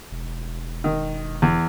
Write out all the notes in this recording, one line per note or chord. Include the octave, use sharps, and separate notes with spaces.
E1
D#3
E2